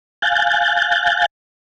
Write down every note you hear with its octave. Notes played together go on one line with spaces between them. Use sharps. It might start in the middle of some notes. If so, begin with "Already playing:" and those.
F5 G#5 F#6 G6 A6